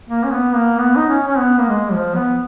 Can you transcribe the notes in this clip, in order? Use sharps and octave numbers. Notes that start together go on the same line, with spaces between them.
A#3
C#4
B3
A#3
B3
D#4
C#4
C#4
B3
A#3
G#3
F3
B3